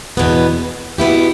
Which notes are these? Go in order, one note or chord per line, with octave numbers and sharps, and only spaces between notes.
E2 B2 B3
B2 B3 E4 G4